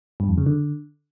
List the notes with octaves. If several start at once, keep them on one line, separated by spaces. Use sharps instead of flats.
G2
F2
C#3
D3